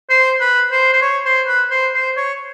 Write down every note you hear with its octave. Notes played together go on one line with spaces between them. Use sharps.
C5
B4
C5
C5
C#5
C5
B4
C5
C5
C#5